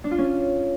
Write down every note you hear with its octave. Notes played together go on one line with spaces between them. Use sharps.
D4
F4
C#4